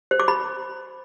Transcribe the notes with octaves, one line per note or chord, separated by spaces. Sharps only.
C5
D6
B5